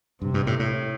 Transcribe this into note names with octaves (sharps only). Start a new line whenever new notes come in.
G2 C3
G2
A2
A2